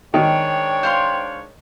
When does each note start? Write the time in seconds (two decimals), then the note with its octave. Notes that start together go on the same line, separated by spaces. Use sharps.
0.14 G#2 D#3 D4 C#5 G5
0.83 C5 F5 C6